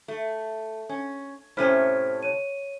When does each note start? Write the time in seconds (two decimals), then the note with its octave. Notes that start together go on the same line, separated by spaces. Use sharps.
0.08 A3
0.89 C#4
1.57 A2 C3 C#4 C5 F6 B6
2.23 C#5 D#7